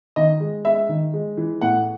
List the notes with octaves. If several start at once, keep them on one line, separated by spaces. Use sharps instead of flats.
D#3 D#5
G#3
G#3 E5
D#3
G#3
E3
A2 F#5